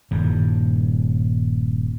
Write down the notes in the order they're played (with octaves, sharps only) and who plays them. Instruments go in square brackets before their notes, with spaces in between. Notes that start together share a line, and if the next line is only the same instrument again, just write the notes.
[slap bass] D#1 G2